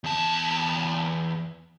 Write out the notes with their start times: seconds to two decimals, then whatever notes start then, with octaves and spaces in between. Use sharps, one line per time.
0.04 E2 A5